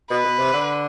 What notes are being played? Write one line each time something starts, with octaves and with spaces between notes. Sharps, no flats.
B2 B4
B2
C3
D3